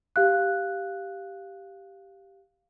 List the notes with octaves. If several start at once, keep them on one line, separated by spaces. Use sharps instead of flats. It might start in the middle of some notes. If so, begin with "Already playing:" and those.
G4 F5 F#6